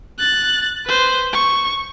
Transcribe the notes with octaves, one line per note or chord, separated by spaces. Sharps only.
F#6 A6
B4 C5
C#6